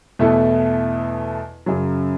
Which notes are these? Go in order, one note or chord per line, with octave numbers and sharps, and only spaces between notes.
E2 B2 A3 E4 A4
F#2 C#3 F#3